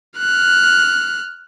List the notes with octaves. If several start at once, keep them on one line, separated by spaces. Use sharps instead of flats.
F6 F#6